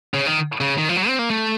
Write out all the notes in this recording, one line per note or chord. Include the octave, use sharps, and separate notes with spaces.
C#3
D#3
C#3
D#3
F3
F#3
C4
A#3
A3